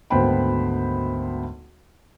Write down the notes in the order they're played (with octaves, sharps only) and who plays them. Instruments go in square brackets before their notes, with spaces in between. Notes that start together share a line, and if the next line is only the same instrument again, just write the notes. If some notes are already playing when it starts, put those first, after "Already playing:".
[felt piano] G#1 D2 B3 C5 G5 B5